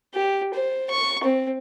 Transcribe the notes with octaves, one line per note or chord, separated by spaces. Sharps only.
G4
C5
C#6
C4